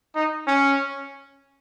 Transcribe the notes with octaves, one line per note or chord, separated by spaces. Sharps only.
D#4
C#4